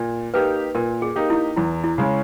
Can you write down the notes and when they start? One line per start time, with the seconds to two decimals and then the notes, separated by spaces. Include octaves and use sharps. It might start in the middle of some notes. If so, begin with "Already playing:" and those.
Already playing: A#2
0.34 A#3 D#4 G4 B4
0.75 A#2 A#4
1.02 G#4
1.16 A#3 D#4 G4
1.30 E4
1.56 E2 E4
1.84 E4
1.98 C#3 G#3 C#4